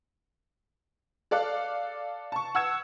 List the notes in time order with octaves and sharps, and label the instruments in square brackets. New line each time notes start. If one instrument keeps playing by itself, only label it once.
[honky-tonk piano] A4 D5 F5 F#6
A5 C#6
F#5 E6 G#6 E7